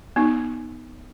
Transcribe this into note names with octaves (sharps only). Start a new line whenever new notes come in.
B3 D#4